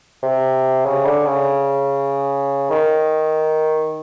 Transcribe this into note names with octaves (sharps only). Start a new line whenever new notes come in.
C3
C#3
D3
C#3
D#3